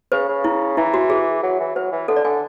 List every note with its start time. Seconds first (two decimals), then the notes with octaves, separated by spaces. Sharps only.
0.12 C#3 B4
0.29 C#3
0.44 E4
0.77 E3 E4
0.94 F#4
1.10 G#4
1.43 F#3
1.59 E3
1.76 F#3 B4
1.92 E3
2.08 D3 A4
2.16 D5
2.24 D3 G#5